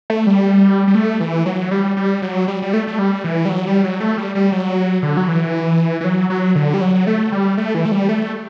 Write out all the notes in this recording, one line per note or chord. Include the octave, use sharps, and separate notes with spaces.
A3
G3
G3
A3
E3
F#3
G3
G3
F#3
G3
G3
A3
A3
G3
E3
G3
F#3
G3
F#3
A3
G3
G3
F#3
D3
F#3
E3
E3
F#3
F#3
D3
G3
F#3
A3
G3
A3
E3
A3
G3
A3